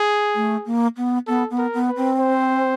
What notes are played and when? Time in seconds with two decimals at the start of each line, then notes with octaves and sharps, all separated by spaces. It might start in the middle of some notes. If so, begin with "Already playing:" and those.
Already playing: G#4
0.35 A3
0.66 A#3
0.97 B3
1.27 B3 A4
1.51 B3
1.58 A#4
1.74 B3
1.89 B4
1.97 C4
2.20 C5